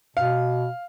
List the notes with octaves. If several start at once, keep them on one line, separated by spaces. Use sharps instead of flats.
B2 F5